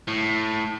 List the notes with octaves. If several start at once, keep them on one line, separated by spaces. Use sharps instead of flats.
A2